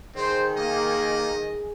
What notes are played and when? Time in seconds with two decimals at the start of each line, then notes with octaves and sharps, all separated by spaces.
0.15 D#3 C4 G#4 C5
0.57 A#3 D#5